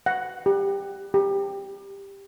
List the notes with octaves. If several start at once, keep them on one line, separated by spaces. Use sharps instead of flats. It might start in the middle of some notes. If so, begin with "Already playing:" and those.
F#5
G4
G4